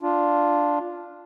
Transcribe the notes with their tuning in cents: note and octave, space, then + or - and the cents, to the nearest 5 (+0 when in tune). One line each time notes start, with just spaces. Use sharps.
D4 +0 F4 +0